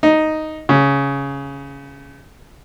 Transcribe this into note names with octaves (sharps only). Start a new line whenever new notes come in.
D#4
C#3